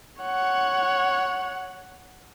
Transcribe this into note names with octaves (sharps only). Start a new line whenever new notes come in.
C#5 F#5